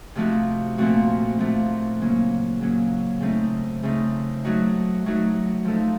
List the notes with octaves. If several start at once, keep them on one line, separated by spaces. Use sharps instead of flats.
C3 F3 A3 D#4 F#4
A#2 F3 A3 C4 F#4
A#2 F3 A3 C4 F#4
C#3 F#3 A#3 C#4
C#3 F#3 A#3 C#4
C#3 A3 C4 D#4
C#3 A3 C4 D#4
F#3 A3 D#4 F#4
F#3 A3 D#4 F#4
F3 A3 D#4 A4